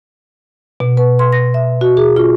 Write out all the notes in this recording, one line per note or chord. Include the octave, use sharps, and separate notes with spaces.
B2
B4
C6
A#6
E5
F#4
G#4
F4